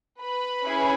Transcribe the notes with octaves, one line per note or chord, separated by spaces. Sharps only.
B4 B5
C#4 E4 G#4